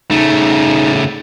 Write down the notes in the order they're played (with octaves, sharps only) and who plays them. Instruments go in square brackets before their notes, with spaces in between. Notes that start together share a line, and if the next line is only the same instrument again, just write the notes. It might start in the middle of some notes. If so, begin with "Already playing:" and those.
[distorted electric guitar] C#3 A3 [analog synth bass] D#4